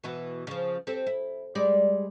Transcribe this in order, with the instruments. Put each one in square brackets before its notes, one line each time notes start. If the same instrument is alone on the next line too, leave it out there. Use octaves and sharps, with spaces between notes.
[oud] B2 E3 B3
C#3 F3
C4 G4 A4
E4
G3 G#3 D5